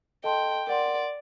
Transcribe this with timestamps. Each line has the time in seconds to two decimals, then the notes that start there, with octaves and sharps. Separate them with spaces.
0.24 A4 D#5 G5 A5 C6
0.67 A#4 D5 F#5 C6